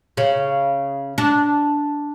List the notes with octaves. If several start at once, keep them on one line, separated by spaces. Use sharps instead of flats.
C#3
D4